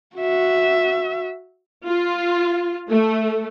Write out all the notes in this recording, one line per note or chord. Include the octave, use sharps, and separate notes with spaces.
F#4 E5
F4
A3